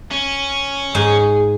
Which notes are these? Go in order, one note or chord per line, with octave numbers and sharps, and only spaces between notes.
C#4
G#2 D#4 G#4 G#5